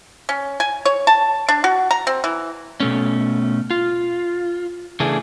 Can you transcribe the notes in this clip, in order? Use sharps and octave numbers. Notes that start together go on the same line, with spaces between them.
C#4
G#5
C#5
A5
D4
F#4
A#5
C4
E3
B2 A3 C#4
F4
C#3 E3 A3 D4 G#4